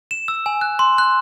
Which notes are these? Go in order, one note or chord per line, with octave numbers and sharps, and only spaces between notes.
E7
E6
G#5
F#6
C6
F#6